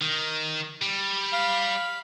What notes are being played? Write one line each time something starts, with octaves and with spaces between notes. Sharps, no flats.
D#3
G3
F5 B5